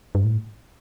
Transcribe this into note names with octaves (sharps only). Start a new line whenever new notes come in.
G2
A2